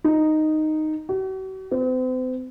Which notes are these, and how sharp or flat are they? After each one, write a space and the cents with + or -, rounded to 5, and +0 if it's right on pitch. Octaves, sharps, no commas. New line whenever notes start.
D#4 -5
F#4 +45
C4 -40